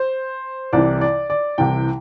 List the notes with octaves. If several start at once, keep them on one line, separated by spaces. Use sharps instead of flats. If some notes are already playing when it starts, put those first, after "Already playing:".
Already playing: C5
C2 C3 E3 D5
D5
D5
C2 C3 E3 G5